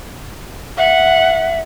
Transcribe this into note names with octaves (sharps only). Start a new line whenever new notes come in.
E5 F#5